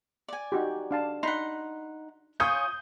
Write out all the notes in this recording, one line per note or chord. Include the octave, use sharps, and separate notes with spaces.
D5 G#5
D#4 F#4 G4
D4 F5 A5
D#4 F#5 B5 C6
F4 C#5 G#5 D#6 G6